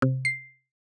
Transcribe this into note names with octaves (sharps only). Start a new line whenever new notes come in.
C3
C7